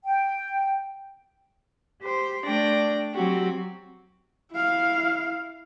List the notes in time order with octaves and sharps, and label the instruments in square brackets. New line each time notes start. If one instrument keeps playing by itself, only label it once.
[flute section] G5
[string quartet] G4 C5
A3 D4 D5 G5 A#6
F#3 C4 F#4 G4
[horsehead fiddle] E4 F5